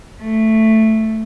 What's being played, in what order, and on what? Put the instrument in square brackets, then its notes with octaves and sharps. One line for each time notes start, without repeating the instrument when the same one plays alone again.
[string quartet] A3